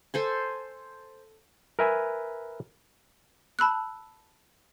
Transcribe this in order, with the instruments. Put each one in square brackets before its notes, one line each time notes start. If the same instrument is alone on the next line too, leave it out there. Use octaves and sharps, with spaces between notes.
[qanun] A4 C5 G#5
[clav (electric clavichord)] A#4 B4 E5 G#5
[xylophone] A5 B5 E6 F#6